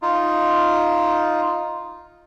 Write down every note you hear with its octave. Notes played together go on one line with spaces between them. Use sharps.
D#4 F4